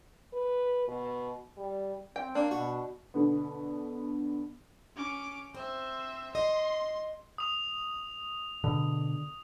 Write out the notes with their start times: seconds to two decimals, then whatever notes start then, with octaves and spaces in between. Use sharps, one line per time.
0.33 B4
0.88 B2
1.57 G3
2.16 C4 G5
2.35 A#3 D4
2.51 B2 F#4
3.14 B2 D3 B3
4.96 C#4 D6
5.55 C4 C5 E5
6.35 D#5 C6
7.38 D#6 F7
8.64 B2 D3